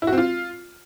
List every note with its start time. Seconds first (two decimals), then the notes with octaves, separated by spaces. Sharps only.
0.02 E4
0.07 F#4
0.12 C4
0.18 F4